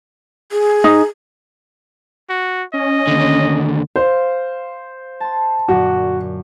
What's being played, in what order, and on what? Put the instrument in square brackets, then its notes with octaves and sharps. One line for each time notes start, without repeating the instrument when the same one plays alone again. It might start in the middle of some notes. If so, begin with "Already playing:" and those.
[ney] G#4
[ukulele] D#4
[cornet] F#4
[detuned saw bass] C#4 [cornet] D#5
[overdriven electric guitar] D#2 D3
[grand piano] C5 [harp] F5
[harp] A5 C6
[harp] F#2 A#2 D3 [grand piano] F#4